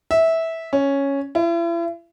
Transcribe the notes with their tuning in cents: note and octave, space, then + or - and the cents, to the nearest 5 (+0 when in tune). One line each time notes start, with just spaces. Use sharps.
E5 -15
C#4 +0
E4 +40